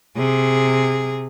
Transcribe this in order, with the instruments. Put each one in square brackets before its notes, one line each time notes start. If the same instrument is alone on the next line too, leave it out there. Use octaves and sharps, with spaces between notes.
[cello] C3 G#4